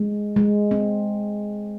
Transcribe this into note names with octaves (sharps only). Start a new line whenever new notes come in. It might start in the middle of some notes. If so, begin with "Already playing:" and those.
Already playing: G#3
G#3
C4